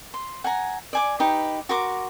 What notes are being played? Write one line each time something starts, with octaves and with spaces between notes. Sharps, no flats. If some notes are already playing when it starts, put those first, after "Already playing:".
C6
F#5 G#5 A#5
D5 G#5 D6
D#4 G4 B4 B5
F#4 A#4 C6 D6